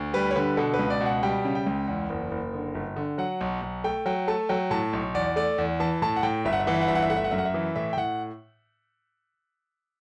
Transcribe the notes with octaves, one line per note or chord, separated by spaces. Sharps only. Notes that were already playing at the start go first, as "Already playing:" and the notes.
Already playing: D2
G3 B4
C#5
D3 B4
B2 A4
B4
C#2
D5
B2
F#5
G3 G5
C#3
G5
C#2
E2
F#1
F#1
D3
G1
D3
F#3 F#5
B1
B1
A3 G5
F#3 G5
A3 A5
F#3 G5
A2 A5
B1
E2 D5
A3 D5
E2
E3 A5
A2 A5
F#5
A2 G5
G1 E5
F#5
E5
E3 F#5
E5
F#5
G1 E5
F#5
E5
A3 F#5
E5
F#5
F#2 E5
F#5
E5
E3
A2 E5
G5
A2 F#5